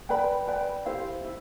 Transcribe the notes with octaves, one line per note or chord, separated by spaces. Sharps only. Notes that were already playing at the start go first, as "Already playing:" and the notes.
B4 D5 G5 B5
B4 D5 G5 B5
E4 G4 C5 F5
E4